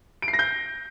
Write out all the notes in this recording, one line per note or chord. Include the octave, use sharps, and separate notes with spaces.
D7
C7
A#6
G6